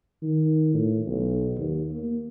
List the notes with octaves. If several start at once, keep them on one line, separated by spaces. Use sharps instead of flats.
D#3
A2
B1
D#2
A#3